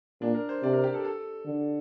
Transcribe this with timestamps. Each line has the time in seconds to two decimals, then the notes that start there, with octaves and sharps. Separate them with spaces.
0.21 A#2 D4
0.34 A#4
0.49 C5
0.63 C3 D5
0.73 A#4
0.84 G4
0.94 A4
1.05 A4
1.46 D3